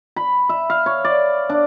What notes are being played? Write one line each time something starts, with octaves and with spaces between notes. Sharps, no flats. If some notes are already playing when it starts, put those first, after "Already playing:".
B5
E5
F5
C#5
D5
D4